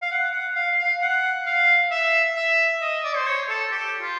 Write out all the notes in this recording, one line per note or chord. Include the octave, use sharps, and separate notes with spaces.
F5
F#5
F#5
F5
F5
F#5
F5
E5
E5
D#5
D5
C5
C#5
A4
G4
F4